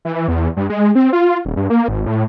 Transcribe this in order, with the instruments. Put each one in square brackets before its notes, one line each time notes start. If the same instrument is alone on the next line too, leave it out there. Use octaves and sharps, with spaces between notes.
[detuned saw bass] E3
E2
G2
G#3
C4
F4
D#1
G2
A#3
G#1
A2